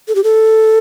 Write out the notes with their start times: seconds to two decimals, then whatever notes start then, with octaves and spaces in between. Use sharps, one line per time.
0.08 A4
0.15 G4
0.24 A4